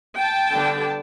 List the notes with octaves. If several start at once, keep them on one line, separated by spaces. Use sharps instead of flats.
G5 A5
D3 G3 B3 D4